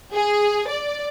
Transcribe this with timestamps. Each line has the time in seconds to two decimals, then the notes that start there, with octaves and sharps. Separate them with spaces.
0.13 G#4
0.68 D5